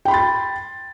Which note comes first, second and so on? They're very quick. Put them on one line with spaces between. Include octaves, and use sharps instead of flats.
G5 B5 C6 A6